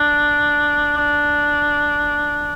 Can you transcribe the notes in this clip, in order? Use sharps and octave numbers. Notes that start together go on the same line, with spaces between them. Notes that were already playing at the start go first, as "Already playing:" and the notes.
Already playing: D4
D4